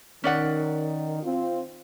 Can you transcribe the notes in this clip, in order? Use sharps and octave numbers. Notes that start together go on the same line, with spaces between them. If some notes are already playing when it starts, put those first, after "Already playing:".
D#3 C#4 D5 F#5
C4 F4